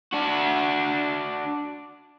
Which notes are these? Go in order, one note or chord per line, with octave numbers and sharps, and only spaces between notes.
D4 F#4